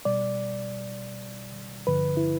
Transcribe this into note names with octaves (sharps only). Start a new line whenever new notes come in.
B2 G3 D5
G2 D3 F3 B4
E4